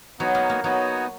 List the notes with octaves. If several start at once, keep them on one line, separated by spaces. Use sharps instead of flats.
F#3 B3 D#4 F#4 C#5
A#3
A#3
F#3 B3 D#4 F#4 C#5